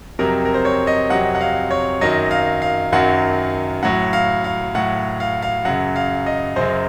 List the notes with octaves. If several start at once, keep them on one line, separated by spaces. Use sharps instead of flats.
F2 C3 F#3 A#4
A#4
C5
C#5
D#5
F2 C3 F#3 F#5
F#5
F5
C#5
F#2 D#3 F#3 D#5
F5
F5
F#2 D#3 F#3 F#5
A2 F#3 F#5
F5
F5
A2 F#3 F#5
F5
F5
F#2 C#3 F#3 F#5
F5
D#5
F#2 C#3 F#3 C5